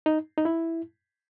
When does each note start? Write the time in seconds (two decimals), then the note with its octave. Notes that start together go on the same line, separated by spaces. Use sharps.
0.06 D#4
0.38 D#4
0.45 E4